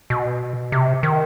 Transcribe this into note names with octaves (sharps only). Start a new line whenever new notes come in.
B2
C3
D#3